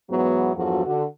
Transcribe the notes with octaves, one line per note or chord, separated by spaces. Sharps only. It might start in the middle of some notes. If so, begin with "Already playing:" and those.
G#2 E3 F#3 B3
E2 G2 F3 F#3 F#4 A4
D3 F#4